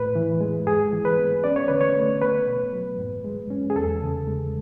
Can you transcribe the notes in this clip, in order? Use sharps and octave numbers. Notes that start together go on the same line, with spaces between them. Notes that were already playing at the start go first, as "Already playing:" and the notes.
Already playing: A2 B4
E3
G#3
G#2 G#4
E3
B4
B3
C#4 D5
C#5
D3 B4
C#5
A3
B3 B4
B2
F#3
G#2
G#3
C#4
G#4
E2 A4
C#3
G#3